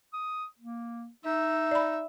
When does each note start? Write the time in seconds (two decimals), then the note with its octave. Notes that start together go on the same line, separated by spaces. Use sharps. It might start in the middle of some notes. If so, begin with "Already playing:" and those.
0.13 D#6
0.59 A#3
1.25 D#4 E5
1.71 D5 B5